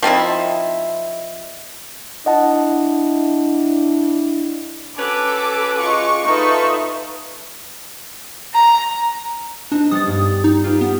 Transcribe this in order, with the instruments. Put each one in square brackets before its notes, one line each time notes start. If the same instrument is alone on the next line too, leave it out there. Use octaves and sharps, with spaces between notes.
[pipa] F3 C4 D#4 E4
[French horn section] D4 E4 [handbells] D#5 F#5 A5
[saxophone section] C#4 F#4 B4 [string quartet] A4 [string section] D6
[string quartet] G#3 F4 [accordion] C#6
[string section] D#4 F4 A4 [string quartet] B4 E5
[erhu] A#5
[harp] C4 D#4 [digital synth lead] D4
[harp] G3 B3 A6 [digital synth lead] D#6
[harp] G2
[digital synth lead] D#4
[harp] F4 G4 B4
[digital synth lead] B3